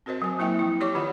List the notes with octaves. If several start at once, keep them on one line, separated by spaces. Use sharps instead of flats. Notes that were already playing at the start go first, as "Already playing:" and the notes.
C4 F#4 A#4 C5 D#5
F#3 G#5
A#3 E4 E5 G5
F3 E4
G4 C#5 D5 C#6 D6
D#3 F4 G4 D#5 F#5